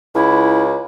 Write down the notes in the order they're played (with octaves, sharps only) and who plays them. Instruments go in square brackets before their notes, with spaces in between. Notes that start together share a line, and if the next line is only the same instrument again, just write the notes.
[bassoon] C#2 [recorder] E4